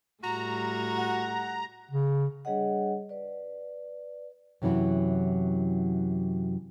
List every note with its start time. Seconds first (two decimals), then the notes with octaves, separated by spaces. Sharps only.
0.23 A2 G3 F#4 A#5
0.98 F#5
1.91 C#3
2.45 G3 D4 G#4 C#5 D#5 F#5
3.09 B4 D5
4.62 F#2 C3 E3 F#3 E4